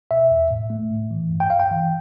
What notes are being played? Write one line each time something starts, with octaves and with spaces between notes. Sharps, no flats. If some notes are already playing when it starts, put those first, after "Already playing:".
B2 E5
E2
A2
A3
A2
E3
G2
G5
G2 F5
G5
E3